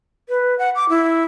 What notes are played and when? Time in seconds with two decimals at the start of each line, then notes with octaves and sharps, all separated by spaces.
0.29 B4
0.59 F#5
0.75 D6
0.89 E4